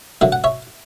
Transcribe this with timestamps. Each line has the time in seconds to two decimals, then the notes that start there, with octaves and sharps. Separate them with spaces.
0.21 D3 F#3 A#3 E5
0.32 F#5
0.44 C#5 E5